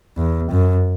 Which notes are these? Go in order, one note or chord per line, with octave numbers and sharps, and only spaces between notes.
E2
F#2